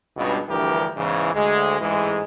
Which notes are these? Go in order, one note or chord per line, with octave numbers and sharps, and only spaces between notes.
C#2 G2 B2
D2 G2 E3 F3 G4 A#4
E2 G#2 C#3 E3
D2 G#3
A1 G#2 E3 G#3